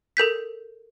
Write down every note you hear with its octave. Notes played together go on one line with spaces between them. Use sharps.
A4 A#4 G6 B6